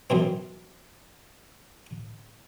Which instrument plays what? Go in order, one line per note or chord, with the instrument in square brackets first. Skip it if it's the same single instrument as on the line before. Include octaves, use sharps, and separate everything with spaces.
[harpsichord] F#2 B2 E3 C4